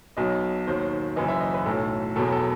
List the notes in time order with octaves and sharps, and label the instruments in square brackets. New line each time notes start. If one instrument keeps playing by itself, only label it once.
[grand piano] B1 B2 F#3 D#5
D#2 D#3 F#3 C5
F#1 F#2 E3 D#5
E5
D#5
B4
B1 A2 F#3 A4
E1 E2 B2 F#3 A4
A4